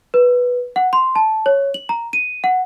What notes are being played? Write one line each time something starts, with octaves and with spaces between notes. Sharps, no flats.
B4
F#5
C6
A5
C#5
F#7
A#5
D#7
F#5